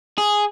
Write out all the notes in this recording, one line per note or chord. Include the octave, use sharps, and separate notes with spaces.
G#4